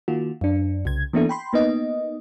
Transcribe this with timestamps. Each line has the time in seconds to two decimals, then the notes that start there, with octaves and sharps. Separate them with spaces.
0.08 D#3 A#3 F4 F#4
0.41 F#2 D4
0.85 C2 C#3 G#6
1.13 E3 A#3 B3 D4 E4 A4
1.29 G5 B5 C6
1.53 A#3 B3 D#4 D#5